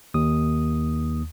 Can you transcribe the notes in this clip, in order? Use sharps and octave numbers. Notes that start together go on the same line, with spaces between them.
D#2 D#6